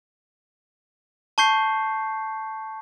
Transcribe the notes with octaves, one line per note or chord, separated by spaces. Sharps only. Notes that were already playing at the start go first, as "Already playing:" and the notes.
A5 C#6 G6 C7